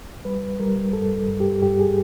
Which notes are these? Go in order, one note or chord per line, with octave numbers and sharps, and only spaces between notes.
G3 B4
G3 A#4
G2 A4
G2
G4
G2 G4
G#4